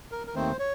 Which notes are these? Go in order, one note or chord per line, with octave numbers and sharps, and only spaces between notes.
A#4
A#4
D#2 D#3 A3 C4 C5
C#5